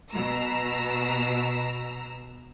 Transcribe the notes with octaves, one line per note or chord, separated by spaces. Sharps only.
B2 A#5 E6